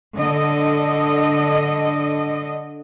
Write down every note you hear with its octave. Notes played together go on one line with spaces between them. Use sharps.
D3 D#5